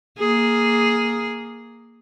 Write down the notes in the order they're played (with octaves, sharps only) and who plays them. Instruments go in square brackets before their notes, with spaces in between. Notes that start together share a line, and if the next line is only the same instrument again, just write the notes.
[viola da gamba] A#3 G#4